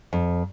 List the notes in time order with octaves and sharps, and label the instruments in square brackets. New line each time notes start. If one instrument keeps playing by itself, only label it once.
[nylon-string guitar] F2